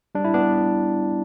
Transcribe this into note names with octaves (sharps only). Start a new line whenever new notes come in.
G3 D4
E4
B3 D4